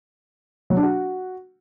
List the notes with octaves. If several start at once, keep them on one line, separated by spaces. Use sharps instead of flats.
F#3
D4
F#4